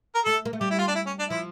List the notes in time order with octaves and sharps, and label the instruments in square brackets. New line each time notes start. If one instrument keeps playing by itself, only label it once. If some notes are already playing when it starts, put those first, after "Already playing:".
[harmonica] A#4
[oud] A3 [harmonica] A4
[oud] A#3
A3
[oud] G3 [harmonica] G4
[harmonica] E4
F4
D4
E4
C#4
D4
[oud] F3 [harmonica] E4